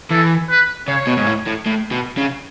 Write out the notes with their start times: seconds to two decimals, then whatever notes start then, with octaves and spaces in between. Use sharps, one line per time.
0.11 E3 A4
0.50 B4
0.88 C#3 C#5
1.07 B2
1.17 G#2
1.27 A2
1.46 A2
1.66 A2
1.92 B2
2.18 C#3